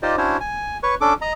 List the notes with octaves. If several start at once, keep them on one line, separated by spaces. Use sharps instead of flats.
D#4 F4 G4 C5 D5 D#5
C#4 D4 E4 F#4 C5 C#5
G#5
B4 C#5 C#6
C#4 D4 A4 D6
D#5 A#5